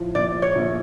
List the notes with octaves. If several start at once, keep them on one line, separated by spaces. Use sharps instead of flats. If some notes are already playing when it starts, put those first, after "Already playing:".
Already playing: A2 F3
A#1 D5
C#5
A#1